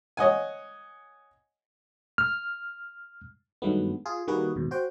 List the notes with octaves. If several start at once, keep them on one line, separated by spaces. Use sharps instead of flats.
C#5 D#5 F#5 G#5
F6
G2 D#3 F#3 G#3 A3 B3
F4 G#4
D#3 G3 A#3 F#4 G#4 B4
D#2 G#2 B2
F#4 C5 G5